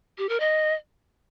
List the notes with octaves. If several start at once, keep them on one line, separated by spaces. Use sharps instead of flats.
G4
A#4
D#5